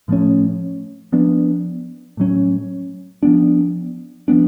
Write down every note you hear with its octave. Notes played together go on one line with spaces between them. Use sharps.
A2 F3 A3 C#4
F3 B3 D4
A2 F#3 C#4
F3 B3 D4
F3 B3 D4